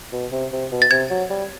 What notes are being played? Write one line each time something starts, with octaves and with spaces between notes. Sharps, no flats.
B2
C3
C3
B2
A6
C3 G#6
F#3
G3